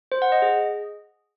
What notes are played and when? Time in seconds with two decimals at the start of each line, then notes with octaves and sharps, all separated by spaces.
0.12 C5
0.22 F#5
0.32 D#5
0.42 G#4